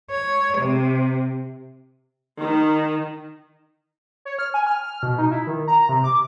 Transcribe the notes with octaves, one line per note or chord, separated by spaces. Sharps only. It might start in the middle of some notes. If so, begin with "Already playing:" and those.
C#5
C3
D#3
C#5
F6
G#5
F6
F6
B2
D#4
E4
D#3
A#5
C3
D6